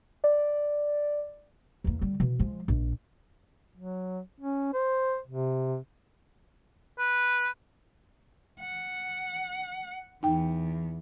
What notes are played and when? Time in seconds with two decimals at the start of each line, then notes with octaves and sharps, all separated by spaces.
0.24 D5
1.84 E2 A#3
2.01 D3 G3
2.20 B2 E3
2.40 F3 G#3
2.68 A#1
3.76 F#3
4.40 C#4
4.74 C5
5.27 C3
6.98 B4
8.60 F#5
10.23 E2 D#4 G5